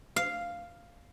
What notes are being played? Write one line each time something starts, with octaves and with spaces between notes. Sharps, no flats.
F5